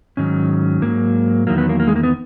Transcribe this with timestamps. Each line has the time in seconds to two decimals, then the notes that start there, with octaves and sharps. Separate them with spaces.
0.17 G#2 D#3 F#3 C#4
0.82 G#2 F#3 A#3
1.47 E2 D#3 F#3 A#3
1.58 B3
1.69 A#3
1.80 A#3
1.87 G#3
1.96 A#3
2.03 B3